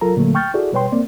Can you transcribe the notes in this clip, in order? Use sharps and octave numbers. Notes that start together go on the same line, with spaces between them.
C2 F#3 F4 A4 A#4 A#5
A#2 D3 F#3 A3 A#3 A4
G5 C#6 F6 G6 A6
E4 F#4 G#4 A4 D5
B2 G3 B4 C#5 G5 C6
A#3 C4 D5